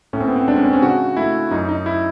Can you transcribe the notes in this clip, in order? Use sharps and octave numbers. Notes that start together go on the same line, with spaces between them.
A2 C#4
C4
B3
C4
G#3 D4
C#4
C4
C#4
C#3 F#4
A3 E4
F#2 D#4
D#4
E4